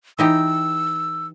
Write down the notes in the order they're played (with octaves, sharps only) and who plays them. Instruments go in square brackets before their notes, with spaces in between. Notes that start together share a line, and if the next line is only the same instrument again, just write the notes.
[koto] E3 D#4 G4 [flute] E6